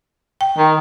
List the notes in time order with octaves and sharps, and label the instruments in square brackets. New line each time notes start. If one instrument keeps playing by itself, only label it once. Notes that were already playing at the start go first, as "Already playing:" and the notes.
[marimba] G5
[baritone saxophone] D#3